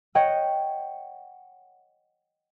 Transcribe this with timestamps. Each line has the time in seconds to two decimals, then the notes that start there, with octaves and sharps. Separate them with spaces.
0.15 C#5 D#5 F#5 G5